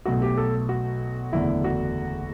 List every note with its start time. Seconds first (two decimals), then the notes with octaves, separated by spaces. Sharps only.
0.05 B1 B2 F#3 A3 F#4
0.22 G4
0.37 A4
0.69 F#4
1.32 F#1 E2 D3 A3 E4
1.64 F#4